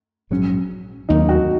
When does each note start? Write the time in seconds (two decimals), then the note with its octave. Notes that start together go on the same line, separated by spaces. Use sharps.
0.31 A#1 G#2 F#3 C#4
1.09 D#2 D#3 F#3 A#3 D#4
1.29 F#4